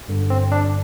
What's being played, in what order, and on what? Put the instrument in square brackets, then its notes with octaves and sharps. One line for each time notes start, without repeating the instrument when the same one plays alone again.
[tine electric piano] G1 G2 D3
C4
D4